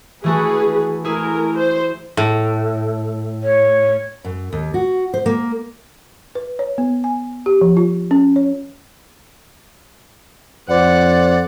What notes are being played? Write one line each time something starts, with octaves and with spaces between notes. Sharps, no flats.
E3 A3 F#4 G#4 B4
A3 E4 G#4 A#4
C5
A2
C#5
F#2
D#2
F#4
C5
A#3
B4
C#5
B3
G#5
G4
F3
F4
C#4
C#5
F2 C5 D5 F#5